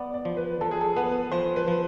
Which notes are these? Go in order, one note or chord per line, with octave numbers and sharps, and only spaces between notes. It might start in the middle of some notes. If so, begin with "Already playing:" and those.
Already playing: B3 D5
D5
F3
B4
F3 A4
G#4
A4
B3 B4
F3 C5
B4
F3